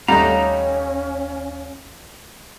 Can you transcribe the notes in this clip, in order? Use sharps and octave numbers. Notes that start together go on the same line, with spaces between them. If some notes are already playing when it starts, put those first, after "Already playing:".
D#2 G3 A3 C#4 D#4 F5 F#5 A#5